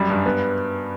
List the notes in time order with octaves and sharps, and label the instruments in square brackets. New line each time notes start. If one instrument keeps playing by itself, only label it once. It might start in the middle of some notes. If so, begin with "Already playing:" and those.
Already playing: [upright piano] F#2 G3
G2
B3